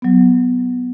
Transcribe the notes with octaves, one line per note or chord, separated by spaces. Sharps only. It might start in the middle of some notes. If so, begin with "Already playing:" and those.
F#3 B3